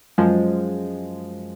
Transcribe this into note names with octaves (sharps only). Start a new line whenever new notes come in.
F#2 F3 G#3